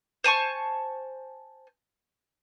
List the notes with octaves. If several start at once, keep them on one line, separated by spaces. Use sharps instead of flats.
C5 G#5 A5 C#6